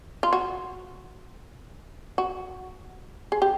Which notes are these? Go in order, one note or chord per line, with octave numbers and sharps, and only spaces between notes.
F4
F#4
F#4
G#4
G4